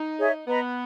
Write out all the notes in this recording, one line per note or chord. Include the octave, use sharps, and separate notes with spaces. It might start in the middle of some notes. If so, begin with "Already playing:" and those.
Already playing: D#4
G#4 C#5 E5
B3 B4 D#5 A#5